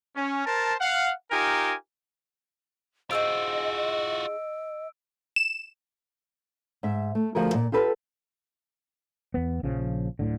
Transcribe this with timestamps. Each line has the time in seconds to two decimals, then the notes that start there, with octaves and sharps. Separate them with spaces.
0.15 C#4
0.46 A#4 C5 A5
0.81 F5 F#5
1.31 D#4 F4 G4 A#4 G#5
3.11 D#4 F4 F#4 G#4 C5 D#5 E6 D7
5.36 E7
6.83 G#2 E5
7.15 A3
7.35 D2 F3 F#4 G#4 A#4
7.54 A#2 D5
7.72 F4 G4 A4 B4
9.34 E2 B3
9.63 A#1 C#3 F3
10.19 D1 A2 D3